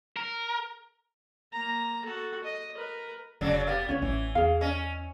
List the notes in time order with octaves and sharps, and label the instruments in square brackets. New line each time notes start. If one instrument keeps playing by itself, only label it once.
[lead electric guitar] A#4
[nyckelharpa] A#3 A#5
F#4 A4
D#5
A#4 B4
[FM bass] F1 [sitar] C#3 F#3 D4
[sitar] B3 [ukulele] G4 D5 F5
[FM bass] C#2 [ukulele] C#4 C#5
[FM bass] A1 [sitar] E3
[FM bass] E2 [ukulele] G#4 F5
[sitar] C#4 [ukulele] D#5